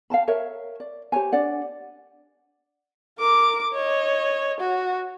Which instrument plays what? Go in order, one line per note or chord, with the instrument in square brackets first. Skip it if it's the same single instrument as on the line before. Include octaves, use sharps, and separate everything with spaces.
[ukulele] F5 G5 A5 B5
A#4 C#5 E5
D5
G4 C5 C#5 G#5
D4 D5 F#5
[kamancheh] A#4 D6
C#5 D#5
F#4